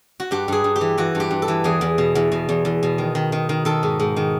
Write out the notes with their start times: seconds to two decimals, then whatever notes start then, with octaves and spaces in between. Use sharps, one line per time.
0.20 F#4
0.31 G2 G4
0.48 G2 G#4
0.64 G2
0.76 G4
0.81 E3
0.98 E3 F#4
1.15 G2
1.20 G4
1.31 G2
1.42 A4
1.48 E3
1.64 E2 G#4
1.81 E2
1.98 B2
2.15 E2
2.32 B2
2.49 E2
2.65 E2
2.83 B2
2.98 D#3
3.15 D#3
3.32 D#3
3.49 D#3
3.65 D#3 A4
3.83 G#2
4.00 G#2
4.16 D#3